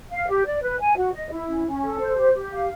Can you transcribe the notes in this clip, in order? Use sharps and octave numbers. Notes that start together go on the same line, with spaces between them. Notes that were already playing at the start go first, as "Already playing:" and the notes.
F5
G4
D5
B4
G#5
F#4
D#5
E4
C#4
C#4
A4
C5
G4
G4
F5